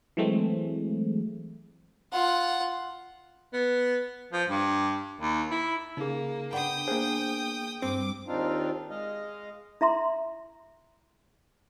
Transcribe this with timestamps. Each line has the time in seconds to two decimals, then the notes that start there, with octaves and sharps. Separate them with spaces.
0.17 E3 F#3 G#3 A3 C4
2.12 F4 F#5
3.53 B3
4.32 F3
4.49 G2
5.20 D#2
5.51 E4
5.97 C#3 A#3 D#4 G#4
6.53 B3 D4 F#5 G5 B5 D#6
6.88 A#3 G#4 C5
7.82 G2 C4 D6
8.27 D#2 C4 D4 D#4 F4 F5
8.90 G#3 D#5 F5
9.81 E4 E5 A#5 C6